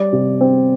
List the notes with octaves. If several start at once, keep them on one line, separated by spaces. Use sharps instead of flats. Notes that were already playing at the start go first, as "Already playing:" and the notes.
Already playing: G3 D5
C3
C4